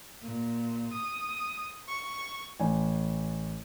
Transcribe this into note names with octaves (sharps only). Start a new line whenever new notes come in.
A#2
D#6
C#6
A1 G#5